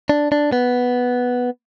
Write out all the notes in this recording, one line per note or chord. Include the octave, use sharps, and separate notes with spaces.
D4
D4
B3